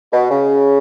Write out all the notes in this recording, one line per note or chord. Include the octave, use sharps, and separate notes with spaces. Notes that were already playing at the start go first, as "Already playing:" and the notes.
B2
C#3